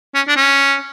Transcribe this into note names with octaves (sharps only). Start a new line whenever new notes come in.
C#4
D4
C#4